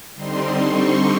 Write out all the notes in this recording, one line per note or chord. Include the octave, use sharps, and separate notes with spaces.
D3 G3 C4 D#4 C6
C#6